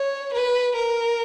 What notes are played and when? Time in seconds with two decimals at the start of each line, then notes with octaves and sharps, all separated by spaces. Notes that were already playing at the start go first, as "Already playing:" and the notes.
Already playing: C#5
0.34 B4
0.75 A#4